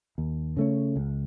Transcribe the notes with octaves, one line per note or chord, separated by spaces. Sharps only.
D#2
C#3 A3 C#4
C#2